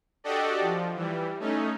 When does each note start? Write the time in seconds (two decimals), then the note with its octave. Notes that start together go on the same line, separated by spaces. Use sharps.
0.24 D4 F#4 G4 A4 D5 D#5
0.61 F3
0.95 E3 G3
1.40 A3 C#4 D#4